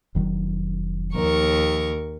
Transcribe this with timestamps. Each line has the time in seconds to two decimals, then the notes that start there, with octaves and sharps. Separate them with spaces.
0.15 F1 D#3 F#3
1.14 D#2 F3 A#4 C#6